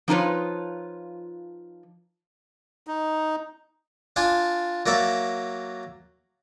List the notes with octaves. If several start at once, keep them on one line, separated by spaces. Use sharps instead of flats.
F3 D#4 F4 B4 C#5
D#4
D4 F4 G#5
F#3 A#3 D5 E5